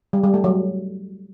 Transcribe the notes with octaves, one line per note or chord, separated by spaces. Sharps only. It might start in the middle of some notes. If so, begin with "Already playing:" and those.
G3
G3
A3
F#3